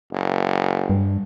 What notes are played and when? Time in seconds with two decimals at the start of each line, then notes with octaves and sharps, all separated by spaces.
0.12 F#1
0.89 G2